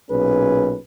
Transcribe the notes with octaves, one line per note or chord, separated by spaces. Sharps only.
B1 A#2 C#4 G#4 B4